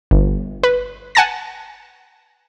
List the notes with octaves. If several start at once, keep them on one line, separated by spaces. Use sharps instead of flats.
G1
B4
F#5 G#5 A5 A6 A#6